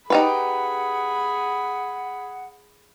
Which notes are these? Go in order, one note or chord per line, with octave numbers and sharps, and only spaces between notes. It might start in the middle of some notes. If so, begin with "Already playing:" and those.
D#4 G4 G#4 B4 F#5 B5